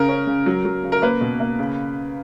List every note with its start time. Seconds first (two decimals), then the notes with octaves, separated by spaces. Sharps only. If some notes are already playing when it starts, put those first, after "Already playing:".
Already playing: C#3 A#4
0.09 C#4
0.27 C#3
0.46 F#3
0.65 F#3
0.83 C#3
0.92 A#4
1.02 A#3 B4
1.21 B2
1.40 A#3
1.59 C#3